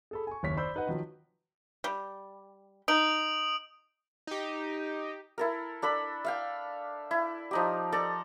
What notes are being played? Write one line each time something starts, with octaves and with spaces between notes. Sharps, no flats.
G#4 A4 B5
G#5 C#6
F#1 D#2 C#5 C#6 B6
C5 D5 B5 E6 G6
D#4 B4 D#5 F#5
D#3 F3 F#3
G3
D#4 D#6 D7 F#7
D#4 G4
E4 A4 A#4
D4 A4 B5
E5 F5 G5
E4
F3 D#4 G4
A4 D5 A#5